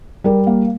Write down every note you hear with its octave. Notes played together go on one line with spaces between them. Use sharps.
G3 A#4
A#3